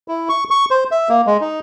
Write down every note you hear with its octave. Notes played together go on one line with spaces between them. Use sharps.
E4
C#6
C#6
C5
E5
A#3
G#3
D#4